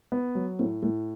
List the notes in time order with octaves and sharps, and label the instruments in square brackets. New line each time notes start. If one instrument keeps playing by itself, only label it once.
[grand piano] B3
F#3
[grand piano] A2 [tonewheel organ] A#3 C4
[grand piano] A2 [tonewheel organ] G#3 A#3